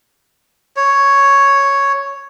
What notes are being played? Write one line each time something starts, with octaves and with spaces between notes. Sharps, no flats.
C#5